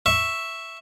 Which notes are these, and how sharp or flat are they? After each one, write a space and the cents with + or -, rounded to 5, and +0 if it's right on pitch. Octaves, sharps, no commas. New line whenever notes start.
E5 +0 C#6 +0